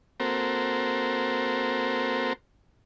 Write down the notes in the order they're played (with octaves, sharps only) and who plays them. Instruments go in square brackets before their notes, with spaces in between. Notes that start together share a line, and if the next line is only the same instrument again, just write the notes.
[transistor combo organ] A#3 C4 F#4 A4 A#4 C5